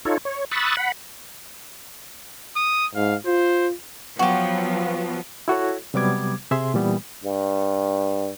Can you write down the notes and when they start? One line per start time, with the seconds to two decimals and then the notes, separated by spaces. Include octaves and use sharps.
0.05 D#4 F4 A4 C#5
0.25 C#5
0.51 B5 C#6 D#6 E6 F#6 A6
0.77 F#5 B5
2.56 D#6
2.95 G#2 F5
3.26 F4 C5
4.19 F3 F#3 B3 F#4 G4
5.48 E4 F#4 A4 C#5
5.94 C3 F#3 G3 B3 D6 G#6
6.51 C3 G#4 E5 C6
6.74 A#2 E3 G3 B3
7.24 G2